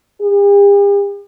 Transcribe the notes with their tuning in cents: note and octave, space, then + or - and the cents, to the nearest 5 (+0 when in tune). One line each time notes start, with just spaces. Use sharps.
G4 +45